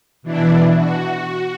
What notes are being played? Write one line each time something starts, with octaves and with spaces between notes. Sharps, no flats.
B2 E3 D4 E4
F#4